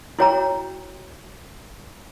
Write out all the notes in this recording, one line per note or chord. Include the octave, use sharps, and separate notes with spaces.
E4 F#4 C#5 G5 A#5